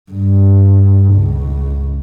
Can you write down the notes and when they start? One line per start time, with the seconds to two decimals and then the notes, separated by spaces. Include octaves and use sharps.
0.11 G2
1.13 C#2